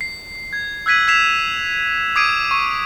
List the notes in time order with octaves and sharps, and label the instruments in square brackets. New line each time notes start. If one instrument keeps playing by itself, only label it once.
[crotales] C7
G#6
E6 F#6 G#6 B6 D#7 F#7
E6 G#6 B6 C7 E7 F7
D6 D#6 G#6 C7 D7 D#7
C#6